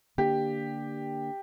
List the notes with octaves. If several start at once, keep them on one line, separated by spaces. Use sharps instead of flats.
D3 A#3 D4 G4